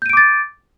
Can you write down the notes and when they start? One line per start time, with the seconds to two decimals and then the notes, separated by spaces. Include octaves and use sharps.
0.02 G6
0.06 D#7
0.09 D7
0.13 D6
0.17 A6